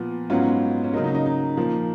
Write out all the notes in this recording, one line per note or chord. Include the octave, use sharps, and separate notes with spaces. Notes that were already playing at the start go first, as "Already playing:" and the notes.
Already playing: A#2 F3 B3
G#2 F#3 B3 C#4 F4
C#4
C#3 F#3 A#3 D#4
D#4
D#4
D#4
A#2 F3 A#3